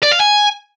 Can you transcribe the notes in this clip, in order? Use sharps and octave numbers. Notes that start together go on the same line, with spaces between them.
D5
F5
G#5